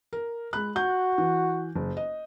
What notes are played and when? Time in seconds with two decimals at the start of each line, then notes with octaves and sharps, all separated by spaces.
0.13 A#4
0.53 G#3 B5 F#6
0.76 F#4 G6
1.18 E3
1.76 F#1
1.97 D#5